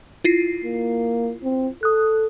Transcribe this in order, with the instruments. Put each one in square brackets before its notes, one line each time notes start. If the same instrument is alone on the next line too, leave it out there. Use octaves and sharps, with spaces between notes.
[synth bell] E4 F4 C7
[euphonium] A#3
C4
[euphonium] A4 [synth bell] D#6 F#6